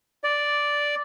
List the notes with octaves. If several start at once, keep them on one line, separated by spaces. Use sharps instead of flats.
D5